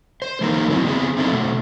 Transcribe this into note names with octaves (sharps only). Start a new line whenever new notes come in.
C5
E3 A3 A#3 D#4 A#4
F#3 C4 E4
B3 C4 G#4
C4 D#4 E4 A4 C5
B2 A3